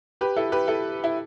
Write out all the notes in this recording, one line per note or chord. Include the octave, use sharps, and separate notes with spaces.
G4 B4
E4 A4
G4 B4
E4 A4
E4